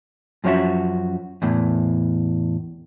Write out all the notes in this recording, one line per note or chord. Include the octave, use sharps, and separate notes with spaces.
F#2 F3 C#4 F#4 E5
E2 A2